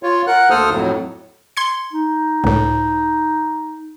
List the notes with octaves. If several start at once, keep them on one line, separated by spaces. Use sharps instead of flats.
F4 C#5
A#4 F#5 F#6
D2 A#3 A4 C5 D#6 F6
F2 A2 F#3
C6 G#6 C#7
D#4
C#2 A2